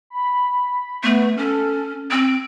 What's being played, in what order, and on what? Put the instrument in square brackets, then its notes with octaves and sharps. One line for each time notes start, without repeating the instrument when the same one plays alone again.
[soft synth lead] B5
[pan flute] A3 [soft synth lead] B3
[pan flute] C#4 [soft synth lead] A4
[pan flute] C4 [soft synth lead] D7